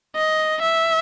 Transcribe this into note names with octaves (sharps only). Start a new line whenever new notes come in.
D#5
E5